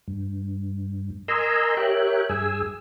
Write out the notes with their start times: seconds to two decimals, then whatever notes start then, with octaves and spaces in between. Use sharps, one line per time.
0.08 G2
1.28 A#4 D#5 G#5 A#5 C6 E6
1.77 G4 A#4 C#5 E5 G5 F#6
2.29 G2 G#4 G#5 E6